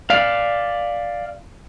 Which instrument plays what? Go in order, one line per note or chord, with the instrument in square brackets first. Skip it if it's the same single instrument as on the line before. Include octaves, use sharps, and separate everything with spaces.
[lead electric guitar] D5 F5